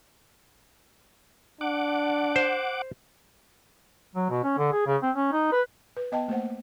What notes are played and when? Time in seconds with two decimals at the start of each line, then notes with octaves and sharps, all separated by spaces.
1.61 D4 F#5 D6
2.36 C5
4.15 F#3
4.30 B2
4.44 C#4
4.58 D3
4.72 G#4
4.87 C#3
5.03 C4
5.16 C#4
5.32 D#4
5.52 B4
5.97 B4
6.12 B3 D#5 G5 A5
6.28 A3 A#3 C5 F#5